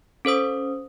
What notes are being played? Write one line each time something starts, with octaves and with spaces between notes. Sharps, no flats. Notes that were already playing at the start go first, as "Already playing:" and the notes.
C#4 A4 C5 D#6